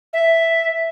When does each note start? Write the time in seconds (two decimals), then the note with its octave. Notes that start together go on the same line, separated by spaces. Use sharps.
0.13 E5